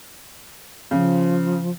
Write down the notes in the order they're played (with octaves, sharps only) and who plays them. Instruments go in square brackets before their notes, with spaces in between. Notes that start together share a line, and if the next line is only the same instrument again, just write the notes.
[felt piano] C#3 [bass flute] F3